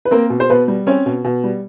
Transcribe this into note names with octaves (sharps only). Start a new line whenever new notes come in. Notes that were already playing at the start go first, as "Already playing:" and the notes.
B4
A#3 C4 A#4
B2
C5
B2 B3 B4
G3
C4 C#4 C#5
B2
B2
G3